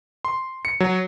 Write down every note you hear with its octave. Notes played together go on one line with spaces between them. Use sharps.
C6
C#7
F#3